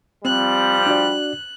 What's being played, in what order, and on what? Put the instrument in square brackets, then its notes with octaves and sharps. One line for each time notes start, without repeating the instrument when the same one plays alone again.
[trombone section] F3 G3 [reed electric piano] C4 [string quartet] F#6
[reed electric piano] D4 F#4 D5